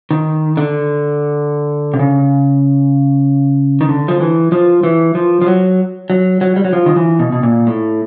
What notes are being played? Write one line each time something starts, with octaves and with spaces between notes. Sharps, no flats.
D#3
D3
C3
C#3
D#3
D3
F3
E3
F3
E3
F3
F3
F#3
F#3
F#3
G3
F#3
F3
D#3
E3
B2
B2
A#2
A2